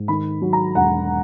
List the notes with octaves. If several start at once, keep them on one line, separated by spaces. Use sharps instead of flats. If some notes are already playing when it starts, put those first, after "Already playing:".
Already playing: G#2
D#3 B5
F#3
A#5
E1 F#5